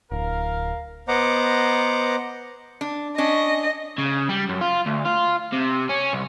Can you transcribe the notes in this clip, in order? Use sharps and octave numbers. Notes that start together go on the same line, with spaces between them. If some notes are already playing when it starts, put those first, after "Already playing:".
D1 A#4 F5
B3 C5 D#5 F#5 A#5 D6
D4
C#4 D4 D#5
C#3
G3
F#2
F4
D2
F4
C3
C#4
C2